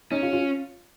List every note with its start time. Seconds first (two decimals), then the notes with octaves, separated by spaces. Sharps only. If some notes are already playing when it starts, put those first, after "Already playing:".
0.11 C#4 D#4
0.22 F4
0.33 F4